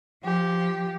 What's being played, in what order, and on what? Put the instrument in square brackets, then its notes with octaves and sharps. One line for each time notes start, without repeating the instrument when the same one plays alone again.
[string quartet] F3 G4